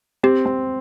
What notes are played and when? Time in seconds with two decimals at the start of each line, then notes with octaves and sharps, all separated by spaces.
0.23 C4 G4
0.46 C4